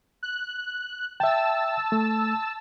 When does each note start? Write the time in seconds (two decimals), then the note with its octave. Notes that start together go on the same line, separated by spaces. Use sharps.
0.23 F#6
1.20 E5 G5 A5 E6
1.92 A3